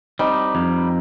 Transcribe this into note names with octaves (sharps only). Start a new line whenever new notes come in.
G3 C4 D#4
F2